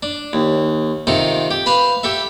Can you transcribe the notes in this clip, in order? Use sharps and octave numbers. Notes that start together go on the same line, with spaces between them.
D4
D#2
C3 D#3 F4 A4
G4
B4 F5 A5
G4 A4 E5